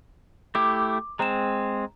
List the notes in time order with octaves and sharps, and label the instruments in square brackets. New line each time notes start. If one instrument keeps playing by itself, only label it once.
[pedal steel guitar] A3 E4 G4 [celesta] D6
[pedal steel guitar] G#3 C4 [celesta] A#5 E7